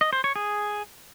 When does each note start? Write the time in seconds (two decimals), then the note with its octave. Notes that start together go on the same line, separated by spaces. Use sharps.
0.01 D#5
0.13 C5
0.24 C#5
0.36 G#4